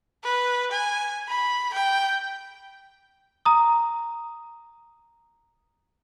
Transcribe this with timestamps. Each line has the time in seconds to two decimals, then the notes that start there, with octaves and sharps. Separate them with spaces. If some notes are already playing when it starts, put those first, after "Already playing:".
0.24 B4
0.72 G#5
1.28 B5
1.74 G5
3.45 A#5 D#6